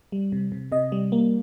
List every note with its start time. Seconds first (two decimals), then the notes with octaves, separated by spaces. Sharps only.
0.12 G3
0.32 C3
0.52 C3
0.72 C3 D#5
0.92 G3
1.12 A#3